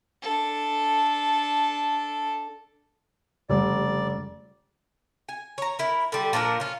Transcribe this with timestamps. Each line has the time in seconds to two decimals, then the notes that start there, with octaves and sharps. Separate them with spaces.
0.22 D4 A4
3.50 F1 C#3 G3 D5
5.29 G#5
5.58 C#5 A#5
5.79 E4 A#4
6.12 D3 G3
6.33 A#2 F3 D4 A#4
6.60 C#4 F4